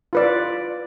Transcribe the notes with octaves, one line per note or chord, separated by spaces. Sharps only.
F4 B4 D5